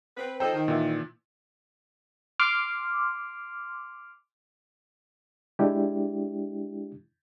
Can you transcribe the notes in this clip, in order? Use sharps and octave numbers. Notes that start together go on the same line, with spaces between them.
C4 B4
F3 D#4 A4 C5 G5 A#5
D#3
A#2 E3 E5
C6 D6 F6
G#3 D4 E4 G4